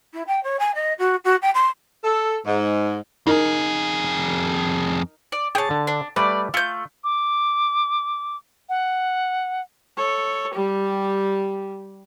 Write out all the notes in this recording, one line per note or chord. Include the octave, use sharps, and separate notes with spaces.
E4
G5
C#5
G#5
D#5
F#4
F#4
G5
C6
A4
G#2
F2 D#4 G#4 A#4
D5
G#4 C#5 G5 A5
D3
D4
G3 A3 B4 D5
A3 F4 G6
D6
F#5
A4 C#5
G3 G4